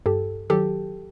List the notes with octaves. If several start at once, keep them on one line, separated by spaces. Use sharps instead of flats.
G2 G4 A4
D#3 F#3 G4 A4